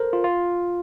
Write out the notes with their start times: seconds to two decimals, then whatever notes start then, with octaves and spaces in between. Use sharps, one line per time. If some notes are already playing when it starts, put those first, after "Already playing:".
Already playing: A4 A#4 C5
0.13 F4
0.24 F4